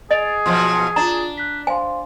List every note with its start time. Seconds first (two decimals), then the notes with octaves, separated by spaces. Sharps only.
0.11 G#4 D#5 A6 D7 F7
0.46 B2 F3 F#3 C6
0.96 D4 F4 A#5 A6
1.37 F#6 B6
1.67 C5 F5 G#5 C6